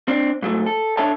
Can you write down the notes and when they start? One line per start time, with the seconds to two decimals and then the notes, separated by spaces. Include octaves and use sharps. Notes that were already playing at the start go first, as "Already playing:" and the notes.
0.08 C4 D4
0.42 G#2 F#3 G#3 A3
0.66 A4
0.97 D4 A4 C#5 E5 A5